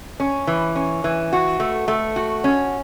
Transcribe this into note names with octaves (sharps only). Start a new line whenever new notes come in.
C#4
E3
C#4
E3
F#4
A3
A3
F#4
C#4